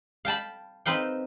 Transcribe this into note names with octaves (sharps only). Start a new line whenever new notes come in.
F5 G5 A5 B5
C4 D#4 B4 F5 G5